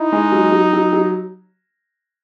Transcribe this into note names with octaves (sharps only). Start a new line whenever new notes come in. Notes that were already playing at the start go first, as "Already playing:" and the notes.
Already playing: D#4 E4
G#3
F#3
F#3
F#3
F#3